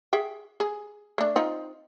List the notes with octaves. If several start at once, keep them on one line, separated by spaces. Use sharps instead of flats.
G#4 E5 G5
G#4
A3 D4
C4 D#4 F4